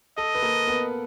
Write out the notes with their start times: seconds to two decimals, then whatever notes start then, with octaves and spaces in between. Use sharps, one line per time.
0.17 A4 D#5
0.35 B4
0.42 A#3 A#4
0.67 B3 B4